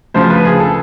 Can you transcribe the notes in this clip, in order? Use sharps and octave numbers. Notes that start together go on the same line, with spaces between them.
D2 C#3 F3 C5
B4
G#4
A4